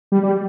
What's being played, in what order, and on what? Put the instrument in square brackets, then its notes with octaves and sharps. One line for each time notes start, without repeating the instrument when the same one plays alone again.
[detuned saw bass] G3
G3